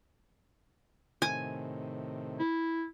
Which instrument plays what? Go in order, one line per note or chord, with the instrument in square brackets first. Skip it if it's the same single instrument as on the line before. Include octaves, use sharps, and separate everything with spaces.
[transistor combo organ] A2 C3 D#3 [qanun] G#5
[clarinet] E4